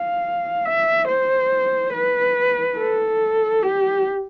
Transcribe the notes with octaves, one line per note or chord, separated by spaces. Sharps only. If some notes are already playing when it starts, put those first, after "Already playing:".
Already playing: F5
E5
C5
B4
A4
G4